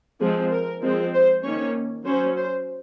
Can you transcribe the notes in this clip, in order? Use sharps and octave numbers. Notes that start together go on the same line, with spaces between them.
F3 G#3 C4 G#4
A#4
F3 G#3 C4
C5
D#3 A#3 C#4 C#5
F#3 C#4 C5
C5